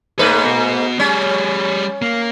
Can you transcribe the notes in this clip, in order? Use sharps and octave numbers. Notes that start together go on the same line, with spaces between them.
G#2 A3 A#3 B4 C#5
B3 F#4
G3 C#4 G#4
A#3